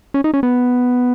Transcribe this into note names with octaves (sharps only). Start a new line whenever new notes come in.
C#4
D#4
C#4
B3